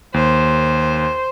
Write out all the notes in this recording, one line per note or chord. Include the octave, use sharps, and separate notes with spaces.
D#2 C5